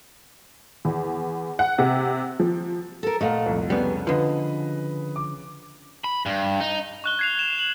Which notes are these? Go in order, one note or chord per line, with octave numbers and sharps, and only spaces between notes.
E2
F#5
C3
F3
A4 A#4
A#2 A3 D#5 F5 F#5
C2 F2
C#3 G3 B3 G#5
D3 F3 B4 D#5
D6
B5
G2
D#4
C#6 F#6 G7
G#6 C7 F7
E7
E7 F#7